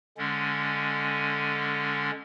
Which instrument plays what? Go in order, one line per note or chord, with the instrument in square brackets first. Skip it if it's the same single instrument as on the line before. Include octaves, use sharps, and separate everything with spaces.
[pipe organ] D3 G#3 C#4